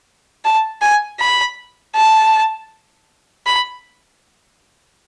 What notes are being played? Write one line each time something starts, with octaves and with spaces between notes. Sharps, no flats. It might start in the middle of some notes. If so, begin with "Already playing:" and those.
A5
G#5
B5
A5
B5